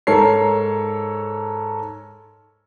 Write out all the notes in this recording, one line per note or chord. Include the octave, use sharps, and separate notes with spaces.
G#2 A4 A#4 C#5 C7